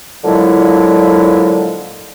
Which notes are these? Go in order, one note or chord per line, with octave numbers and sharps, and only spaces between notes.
A#2 D3 F3 F#3 G#3 E4